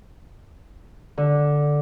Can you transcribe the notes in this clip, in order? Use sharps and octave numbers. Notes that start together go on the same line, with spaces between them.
D3